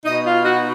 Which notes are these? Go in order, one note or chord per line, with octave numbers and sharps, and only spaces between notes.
B2 D#4 D#5
F4 F5
D#4 F#4 F#5